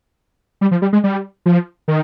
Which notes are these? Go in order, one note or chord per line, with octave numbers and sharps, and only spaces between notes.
G3
F3
G3
G#3
G3
F3
D#3